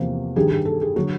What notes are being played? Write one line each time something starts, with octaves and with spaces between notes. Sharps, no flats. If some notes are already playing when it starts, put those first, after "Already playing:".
Already playing: E2 C3 F3 A#3
G2 D#3 G3 G#4
G#4
A4
G#4
D3 F#3 F#4